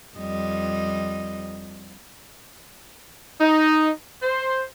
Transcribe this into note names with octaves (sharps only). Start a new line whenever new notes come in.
F2 G3 D#5
D#4
C5